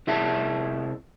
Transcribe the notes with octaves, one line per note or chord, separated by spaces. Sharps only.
C3 E4 G#4 E5 A5